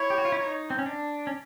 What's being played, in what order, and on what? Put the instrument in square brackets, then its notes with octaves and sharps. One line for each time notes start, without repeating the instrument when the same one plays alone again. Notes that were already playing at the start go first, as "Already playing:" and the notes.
Already playing: [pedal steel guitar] E4 [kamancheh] C#5
[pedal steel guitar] G4
F#4
F4
E4
D#4
C4
C#4
D4
C#4